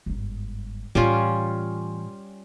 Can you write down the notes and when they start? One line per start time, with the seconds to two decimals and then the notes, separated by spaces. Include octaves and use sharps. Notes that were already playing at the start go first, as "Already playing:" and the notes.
0.06 G1 G#2
0.95 A2 E3 G3 C#4 F4